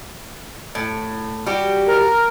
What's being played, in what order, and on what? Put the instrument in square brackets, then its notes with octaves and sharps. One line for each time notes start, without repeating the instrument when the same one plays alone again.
[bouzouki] A2
G3 F#4 G4
[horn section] A#4